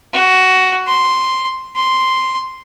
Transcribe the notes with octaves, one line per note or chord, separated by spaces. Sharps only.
F#4
C6
C6